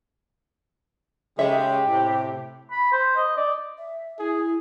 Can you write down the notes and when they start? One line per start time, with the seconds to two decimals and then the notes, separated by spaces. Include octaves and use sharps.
1.39 C#3 G#3 G4 A4 D#5 E5
1.88 A2 C3
2.71 B5
2.92 C5
3.16 D#5
3.37 D5
3.78 E5
4.19 E4 G#4